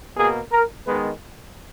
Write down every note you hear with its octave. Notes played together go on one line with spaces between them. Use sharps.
B2 A#3 G#4
A#4
D#3 G#3 B3 B4